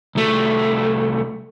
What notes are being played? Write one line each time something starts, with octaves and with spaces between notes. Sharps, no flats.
C2 A3